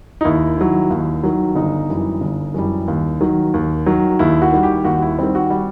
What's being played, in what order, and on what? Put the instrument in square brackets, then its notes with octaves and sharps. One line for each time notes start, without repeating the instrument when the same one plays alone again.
[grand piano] D#4
D#2 E4
D#3 F#3
D#2
D#3 F#3
G1 D#4
F#2 E3 G3
G1
F#2 E3 G3
D#2
D#3 F#3
D#2
D#3 F#3
D#2 E4
F#4
D#3 G3
G4
D#2 F#4
E4
D#3 G3 C4
F#4
G3